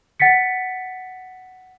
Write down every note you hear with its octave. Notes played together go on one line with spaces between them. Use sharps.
F#5 A6 B6 C#7